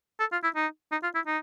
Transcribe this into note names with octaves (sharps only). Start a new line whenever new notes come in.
A4
F4
E4
D#4
D#4
F4
E4
D#4